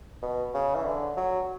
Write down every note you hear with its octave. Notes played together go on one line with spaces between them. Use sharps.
B2
C#3
E3
D3
F#3